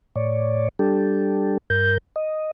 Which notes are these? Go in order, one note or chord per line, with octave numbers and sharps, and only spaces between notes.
A2 C#5 D5
G3 D4 G4 A4
G2 A#4 G6
D#5